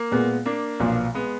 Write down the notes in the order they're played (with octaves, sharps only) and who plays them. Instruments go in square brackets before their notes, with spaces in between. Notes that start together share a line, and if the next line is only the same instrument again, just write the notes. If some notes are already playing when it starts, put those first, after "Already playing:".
Already playing: [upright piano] A#3
[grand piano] A#2 G#3 B3
[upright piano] A#3 D4
[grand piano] B1 A#2 F3 B3
[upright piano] G#3 B3